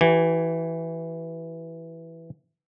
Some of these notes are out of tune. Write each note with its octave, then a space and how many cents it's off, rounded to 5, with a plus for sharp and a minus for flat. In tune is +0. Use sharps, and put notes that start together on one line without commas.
E3 +0 G4 -45 G#5 -10